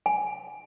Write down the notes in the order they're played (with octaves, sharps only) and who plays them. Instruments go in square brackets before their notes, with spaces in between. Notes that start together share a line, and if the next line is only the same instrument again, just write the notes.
[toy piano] G#5